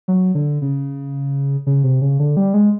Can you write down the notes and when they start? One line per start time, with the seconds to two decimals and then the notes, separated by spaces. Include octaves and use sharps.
0.08 F#3
0.35 D3
0.62 C#3
1.66 C#3
1.84 C3
2.02 C#3
2.20 D3
2.37 G3
2.54 G#3